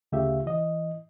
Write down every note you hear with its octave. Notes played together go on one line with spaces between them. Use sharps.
D2 C#3 A3 F4 G4 E5
E3 D#5